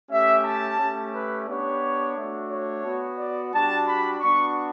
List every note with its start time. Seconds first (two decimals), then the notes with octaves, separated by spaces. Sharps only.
0.10 A3 C#4 G4 E5
0.44 A5
0.79 A3 C#4 G4
1.13 B4
1.47 B3 D4 G4 C#5
2.15 A3 D4 F#4
2.50 C#5
2.84 B3 F#4
3.18 D5
3.52 G3 D4 F#4 A5
3.87 B5
4.20 B3 D4 F#4 C#6